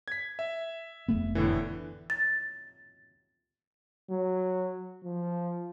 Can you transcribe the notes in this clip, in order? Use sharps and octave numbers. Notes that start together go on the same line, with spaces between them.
G#6 B6
E5
F1 A3 B3
A2 D3 E3
A6
F#3
F3